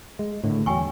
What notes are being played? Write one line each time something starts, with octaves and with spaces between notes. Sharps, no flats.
G#3
A2 D3 D#3
E2 F#3 G5 G#5 C#6